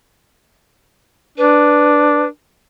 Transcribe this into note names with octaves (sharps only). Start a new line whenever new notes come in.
D4 B4